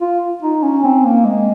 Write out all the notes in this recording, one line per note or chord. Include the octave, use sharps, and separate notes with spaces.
F4
D#4
C#4
C4
A#3
G#3